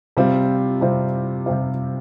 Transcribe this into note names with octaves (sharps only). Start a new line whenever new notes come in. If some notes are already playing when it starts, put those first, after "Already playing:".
C3 G3 C4 F4
C3 G3 C4 F4
C3 G3 C4 F4